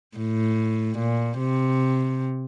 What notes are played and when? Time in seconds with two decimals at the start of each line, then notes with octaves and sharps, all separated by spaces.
0.17 A2
0.98 A#2
1.39 C3